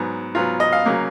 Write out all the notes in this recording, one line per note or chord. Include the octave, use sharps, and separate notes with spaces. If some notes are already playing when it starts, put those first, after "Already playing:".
Already playing: G#2 F#3 B3
G#2 F#3 B3 F4
D#5
F5
C#3 F#3 A#3